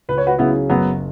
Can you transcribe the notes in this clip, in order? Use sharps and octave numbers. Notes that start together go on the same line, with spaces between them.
C#2 B4
C#5
F#4 B4
C#3 F#3 B3 C#4 E4 G#4
F#1 F#3 B3